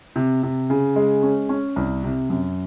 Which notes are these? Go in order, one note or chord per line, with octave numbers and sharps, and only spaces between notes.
C3
C3
C#3
G#3
C#4
C#4
C2
C3
F#2